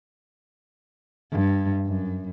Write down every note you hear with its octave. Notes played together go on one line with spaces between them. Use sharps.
G2
F#2